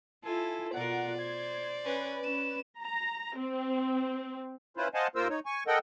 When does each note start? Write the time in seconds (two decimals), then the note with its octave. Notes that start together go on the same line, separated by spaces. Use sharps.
0.24 E4 F4 A4 G#5
0.73 B2 F4 A#4 D5 F#5
1.19 C5 G#6
1.85 C#4 B4
2.24 C#4 E7
2.82 A#5
3.37 C4
4.77 C#4 E4 F4 B4 C5
4.94 C5 D#5 F5 F#5 G#5 A5
5.15 D#2 A#3 F4 A#4 C5 E6
5.30 D#4 C#5
5.46 G#5 C#6
5.67 A4 A#4 D#5 F#5 G5